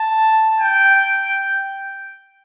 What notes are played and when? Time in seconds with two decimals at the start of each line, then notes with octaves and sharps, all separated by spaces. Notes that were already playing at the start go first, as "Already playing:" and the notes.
Already playing: A5
0.61 G5